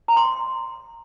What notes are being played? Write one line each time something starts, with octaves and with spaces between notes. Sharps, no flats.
F5 A#5 C6